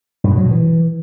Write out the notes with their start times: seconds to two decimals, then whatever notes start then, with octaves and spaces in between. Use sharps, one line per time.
0.24 G2
0.31 B2
0.37 F#3
0.44 B2
0.51 E3